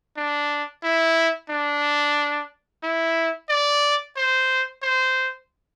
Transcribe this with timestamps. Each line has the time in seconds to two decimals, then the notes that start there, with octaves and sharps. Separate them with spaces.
0.17 D4
0.83 E4
1.50 D4
2.83 E4
3.49 D5
4.16 C5
4.82 C5